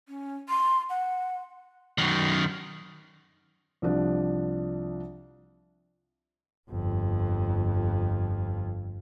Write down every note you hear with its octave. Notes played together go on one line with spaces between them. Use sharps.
C#4
C6
F#5
F#2 D#3
C2 F3 D4
G1 F2